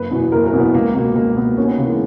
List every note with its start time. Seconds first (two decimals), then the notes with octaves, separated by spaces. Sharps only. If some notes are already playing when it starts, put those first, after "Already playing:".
Already playing: F#1 B4
0.11 E2 B2
0.32 F#1 A#4
0.46 A#4
0.53 E2 B2
0.60 B3
0.74 C#2 A#3
0.94 B2 A#3
1.15 C#2 A#3
1.37 B2 B3
1.57 D#2 C#4
1.68 B3
1.78 C#3 E3 A#3
1.89 G#3